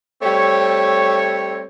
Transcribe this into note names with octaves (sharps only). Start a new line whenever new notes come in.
G3 A3 C4 C#5